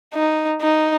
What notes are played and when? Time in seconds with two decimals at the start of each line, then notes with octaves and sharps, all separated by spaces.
0.14 D#4
0.62 D#4